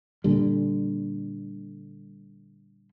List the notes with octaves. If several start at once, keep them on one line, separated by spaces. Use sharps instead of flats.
A#2 D3 G3